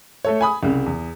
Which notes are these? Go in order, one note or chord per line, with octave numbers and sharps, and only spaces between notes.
A3 A4 C#5
G#5 B5 D#6
C2 C#3
E2